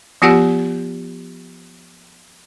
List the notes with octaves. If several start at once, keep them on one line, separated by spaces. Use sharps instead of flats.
F3 B3 F4 G4 F#5